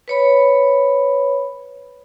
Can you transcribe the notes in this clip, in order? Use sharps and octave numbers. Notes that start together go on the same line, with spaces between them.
B4 C#5 B5